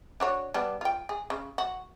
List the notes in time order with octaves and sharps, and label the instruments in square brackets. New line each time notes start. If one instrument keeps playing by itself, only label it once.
[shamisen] D4 F#4 C#5
G3 B3 D4
F4 G5
G#4
C#3
F#4